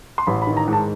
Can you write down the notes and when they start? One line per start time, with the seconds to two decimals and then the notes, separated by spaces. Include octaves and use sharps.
0.18 C6
0.27 A1 B5
0.42 B5
0.47 D#3
0.57 A#5
0.68 G#2
0.73 A5